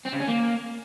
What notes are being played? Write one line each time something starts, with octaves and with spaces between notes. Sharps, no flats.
C4
C#3
C#4
A#3